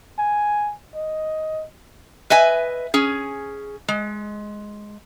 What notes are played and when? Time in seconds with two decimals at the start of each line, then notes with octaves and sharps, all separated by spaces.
0.18 G#5
0.95 D#5
2.30 B4 D#5 E5 G#5
2.94 C#4 G#4
3.88 G#3